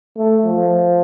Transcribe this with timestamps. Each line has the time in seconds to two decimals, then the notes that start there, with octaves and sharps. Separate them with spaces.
0.17 A3
0.46 F3